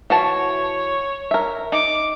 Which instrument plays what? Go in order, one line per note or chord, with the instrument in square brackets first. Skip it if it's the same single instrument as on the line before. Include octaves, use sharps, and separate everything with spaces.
[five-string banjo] E3 F#4 A5 [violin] C#5
[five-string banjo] A#4 E5
[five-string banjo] D#4 [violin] D6